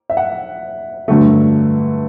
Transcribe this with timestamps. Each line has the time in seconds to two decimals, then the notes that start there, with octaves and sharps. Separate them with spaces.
0.10 E5
0.17 F#5
1.08 G2 D3 F#3 A3